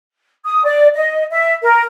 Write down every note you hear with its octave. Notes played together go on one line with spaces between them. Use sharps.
D#6
D5
D#5
E5
A#4